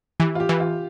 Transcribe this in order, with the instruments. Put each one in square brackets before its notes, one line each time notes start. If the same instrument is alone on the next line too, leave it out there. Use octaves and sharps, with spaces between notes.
[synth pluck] E3 [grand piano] G4
[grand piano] F4
G4
[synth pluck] E3
[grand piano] F4